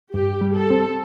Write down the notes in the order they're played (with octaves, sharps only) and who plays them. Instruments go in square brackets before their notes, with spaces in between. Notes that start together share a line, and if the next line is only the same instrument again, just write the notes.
[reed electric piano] G2 [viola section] G4
[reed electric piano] G3
[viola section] A4
[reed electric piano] C4